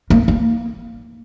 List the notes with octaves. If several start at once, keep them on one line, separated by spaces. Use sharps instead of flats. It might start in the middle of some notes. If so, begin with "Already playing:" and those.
A#3
A#3